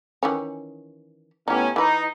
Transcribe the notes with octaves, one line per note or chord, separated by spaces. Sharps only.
D#3 E3 C#4
A2 B3 C#4 D#4 G4
E3 D#4 B4